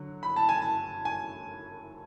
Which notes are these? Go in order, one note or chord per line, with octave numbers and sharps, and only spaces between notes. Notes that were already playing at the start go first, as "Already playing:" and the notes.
Already playing: D3 F#3
B5
A5
G#5
A5
G#5